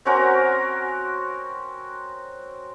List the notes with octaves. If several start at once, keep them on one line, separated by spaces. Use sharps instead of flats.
C4 C#4 F#4 A#4